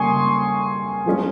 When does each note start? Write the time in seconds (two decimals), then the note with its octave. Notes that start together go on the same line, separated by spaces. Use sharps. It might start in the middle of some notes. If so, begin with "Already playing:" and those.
Already playing: C#3 G3 A#3 C#4 G#5 C6 C#6 D#6
1.06 F3 G#3 C#4